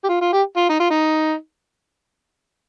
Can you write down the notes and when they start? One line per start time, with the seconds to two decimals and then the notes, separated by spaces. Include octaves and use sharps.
0.04 G4
0.09 F4
0.22 F4
0.33 G4
0.57 F4
0.69 D#4
0.80 F4
0.90 D#4